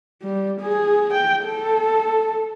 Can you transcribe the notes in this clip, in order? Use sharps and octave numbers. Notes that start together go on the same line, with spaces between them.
G3
G#4
G5
A4